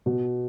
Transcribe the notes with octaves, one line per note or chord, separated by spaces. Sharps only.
B2